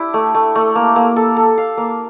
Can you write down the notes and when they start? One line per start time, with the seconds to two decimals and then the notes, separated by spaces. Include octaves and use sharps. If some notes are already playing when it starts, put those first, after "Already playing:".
Already playing: D4 E4 G4
0.14 A3
0.34 A3
0.55 A3
0.75 A#3
0.96 A#3
1.16 A4
1.37 A4
1.58 F5
1.77 A#3